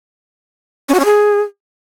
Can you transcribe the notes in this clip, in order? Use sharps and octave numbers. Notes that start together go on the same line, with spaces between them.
C#4
F#4
C#4
G#4